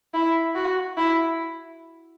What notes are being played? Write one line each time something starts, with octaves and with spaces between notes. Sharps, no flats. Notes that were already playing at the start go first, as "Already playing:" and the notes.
E4
F#4
E4